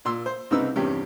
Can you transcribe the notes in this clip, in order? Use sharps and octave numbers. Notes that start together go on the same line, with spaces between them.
A#2 C6 E6
C5
C2 C#3 C4 D#4 B4 E6
E2 G2 C3 C#4 G4